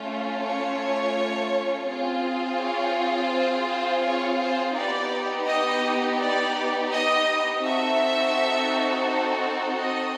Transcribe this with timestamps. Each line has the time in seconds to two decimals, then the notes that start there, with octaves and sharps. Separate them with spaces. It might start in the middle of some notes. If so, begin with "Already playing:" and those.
Already playing: A3 C#4 F4
0.44 C#5
1.88 C4 F4 G#4
2.60 C#5
3.31 C5
3.67 C5
4.04 C#5
4.39 C5
4.75 B3 D#4 G4 D5
5.47 D#5
6.19 D5
6.91 D#5
7.63 C4 D#4 F#4 A4 E5
9.78 D#5